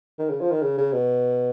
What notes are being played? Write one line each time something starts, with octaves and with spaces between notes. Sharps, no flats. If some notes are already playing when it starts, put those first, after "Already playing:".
D#3
C#3
F3
D#3
C#3
C#3
B2